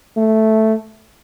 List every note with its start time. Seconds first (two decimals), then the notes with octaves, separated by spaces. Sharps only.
0.17 A3